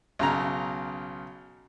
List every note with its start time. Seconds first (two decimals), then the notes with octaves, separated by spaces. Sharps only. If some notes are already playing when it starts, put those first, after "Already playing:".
0.19 B1 C#3 A#5